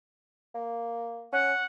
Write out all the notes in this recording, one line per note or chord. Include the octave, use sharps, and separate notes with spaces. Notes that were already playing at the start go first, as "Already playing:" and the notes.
A#3
C#4 F#5